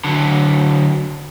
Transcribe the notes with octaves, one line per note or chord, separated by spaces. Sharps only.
D3 F#3